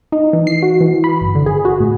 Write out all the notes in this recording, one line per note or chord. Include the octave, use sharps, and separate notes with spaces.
D#4
E3
C7
F#4
E3
B5
G1
D3
G#4
F#4
A2